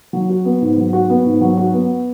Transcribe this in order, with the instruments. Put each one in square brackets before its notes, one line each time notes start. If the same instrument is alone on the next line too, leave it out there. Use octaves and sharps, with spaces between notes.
[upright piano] F#3
F#4
B3
G#2
F#3
F#4
B3
G#2
F#3
F#4
B3